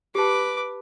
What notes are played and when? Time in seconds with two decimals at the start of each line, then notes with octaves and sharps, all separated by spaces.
0.15 G4 B4 A5 D6